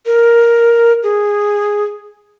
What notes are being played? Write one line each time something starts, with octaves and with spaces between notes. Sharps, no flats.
A#4
G#4